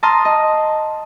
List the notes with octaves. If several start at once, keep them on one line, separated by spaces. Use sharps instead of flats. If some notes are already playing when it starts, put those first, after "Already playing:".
A5 A#5 C6 D#6 F6
D#5